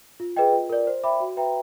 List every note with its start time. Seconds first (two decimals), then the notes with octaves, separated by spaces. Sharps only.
0.20 F4
0.36 G#4 B4 D#5 G5
0.53 F4
0.70 A#4 D5
0.87 C5
1.03 E5 G5 B5 D6
1.20 F#4
1.37 B4 E5 G5 A#5